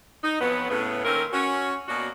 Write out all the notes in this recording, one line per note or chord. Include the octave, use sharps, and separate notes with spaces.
D#4
F2 F#3 B3
A2 C#3 B3
D#3 A#3 C4 C#4 A4 A#4
C#4 F#4
B2 A#3 C#4 D4 F#4